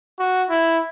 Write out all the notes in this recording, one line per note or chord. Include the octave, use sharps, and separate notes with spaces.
F#4
E4